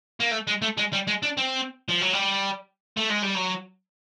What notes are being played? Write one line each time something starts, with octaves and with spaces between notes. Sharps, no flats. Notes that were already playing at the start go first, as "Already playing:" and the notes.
A#3
A3
G#3
A3
G#3
G3
G#3
D4
C4
F3
F#3
G3
A3
G#3
G3
F#3